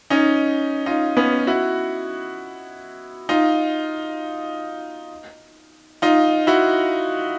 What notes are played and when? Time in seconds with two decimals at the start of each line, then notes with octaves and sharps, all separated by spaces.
0.10 C#4 D#4
0.86 D#4 F4
1.17 B3 C#4
1.47 E4 F#4
3.29 D#4 F4
6.02 D#4 F4
6.47 E4 F#4